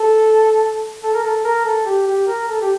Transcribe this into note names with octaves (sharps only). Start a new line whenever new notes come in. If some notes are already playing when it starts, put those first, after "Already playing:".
Already playing: A4
A4
A#4
A4
A#4
A4
G4
G4
A#4
A4
G4